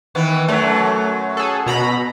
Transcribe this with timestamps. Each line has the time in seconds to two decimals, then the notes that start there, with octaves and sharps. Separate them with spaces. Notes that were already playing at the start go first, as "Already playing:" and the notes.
0.15 D#3 E3 B3
0.48 F#2 F#3 A3
1.37 G#4 A4
1.66 B2 A#5 B5